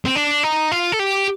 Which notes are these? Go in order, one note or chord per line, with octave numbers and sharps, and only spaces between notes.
C4
D4
D#4
F4
A4
G4